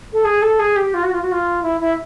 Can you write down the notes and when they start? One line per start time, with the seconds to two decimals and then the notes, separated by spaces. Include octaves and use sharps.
0.13 A4
0.25 G#4
0.42 A4
0.59 G#4
0.76 G4
0.94 F4
1.03 F#4
1.13 F4
1.22 F#4
1.32 F4
1.63 E4
1.81 E4